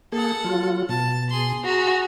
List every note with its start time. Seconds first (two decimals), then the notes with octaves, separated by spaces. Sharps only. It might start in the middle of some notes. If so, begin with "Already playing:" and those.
0.12 A#3 G#4 A4 F#5
0.44 F#3 F4
0.89 B2 A5
1.30 G#4 C6
1.64 F#4 G#4 A#5